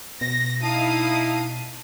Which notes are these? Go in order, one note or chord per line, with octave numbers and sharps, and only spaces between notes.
B2 A#6
D#4 E4 F5 A5 D#6